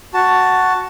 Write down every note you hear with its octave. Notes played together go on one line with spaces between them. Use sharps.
F#4 A5